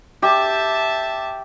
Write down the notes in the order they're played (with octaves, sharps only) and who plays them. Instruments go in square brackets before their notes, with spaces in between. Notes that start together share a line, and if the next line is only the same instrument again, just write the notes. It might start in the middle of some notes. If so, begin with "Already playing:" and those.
[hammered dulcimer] G4 [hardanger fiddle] E5 A5